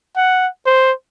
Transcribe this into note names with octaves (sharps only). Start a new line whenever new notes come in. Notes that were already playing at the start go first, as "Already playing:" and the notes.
F#5
C5